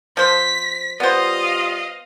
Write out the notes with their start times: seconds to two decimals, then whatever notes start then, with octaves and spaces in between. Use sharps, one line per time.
0.17 F3 C5 B6
1.00 G3 B3 F4 C5 D#5 F5 D#6